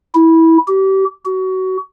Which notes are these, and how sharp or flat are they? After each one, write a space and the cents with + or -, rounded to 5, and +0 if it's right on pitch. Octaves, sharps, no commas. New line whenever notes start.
E4 -15
G4 -30
F#4 +25